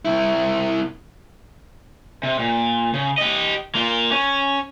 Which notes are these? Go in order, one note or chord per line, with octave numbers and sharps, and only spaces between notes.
C3 E4
C3
A#2
C#3
G4 D#5
A#3 F4
C#4